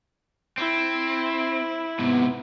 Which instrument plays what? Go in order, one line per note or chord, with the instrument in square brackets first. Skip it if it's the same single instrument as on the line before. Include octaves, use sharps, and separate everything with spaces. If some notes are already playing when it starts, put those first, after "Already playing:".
[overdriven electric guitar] C4 [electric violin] E4
[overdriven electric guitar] G#2 C3 [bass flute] B3